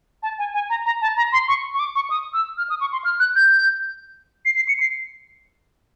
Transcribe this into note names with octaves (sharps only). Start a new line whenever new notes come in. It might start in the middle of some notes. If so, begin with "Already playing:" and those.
A5
G#5
G#5
A#5
A#5
A5
A#5
C6
C#6
C#6
D6
C#6
D#6
E6
F6
D#6
C#6
C6
F6
F#6
G6
C7
C7
C#7
C7